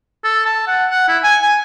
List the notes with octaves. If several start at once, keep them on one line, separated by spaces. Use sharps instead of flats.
A4
A5
F#5
F#5
E4
G#5
G#5